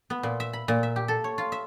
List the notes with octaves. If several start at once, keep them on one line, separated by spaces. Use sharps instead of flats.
B3
A#2
E5
B5
A#2
E5
G4
A4
C#5
F4
E5